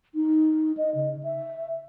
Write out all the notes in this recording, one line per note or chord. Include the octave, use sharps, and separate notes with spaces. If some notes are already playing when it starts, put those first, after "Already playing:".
D#4
D#5
C#3
E5